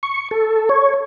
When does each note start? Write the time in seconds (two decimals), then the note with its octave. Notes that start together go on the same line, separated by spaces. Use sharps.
0.03 C#6
0.31 A4
0.69 C#5